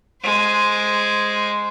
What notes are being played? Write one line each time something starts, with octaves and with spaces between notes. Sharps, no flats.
G#3 C5